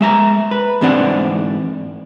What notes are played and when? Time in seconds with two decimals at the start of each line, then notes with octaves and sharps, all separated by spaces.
0.01 G#3 E5 A#5
0.51 B4
0.81 G#2 E3 C4 D4 D5 F#5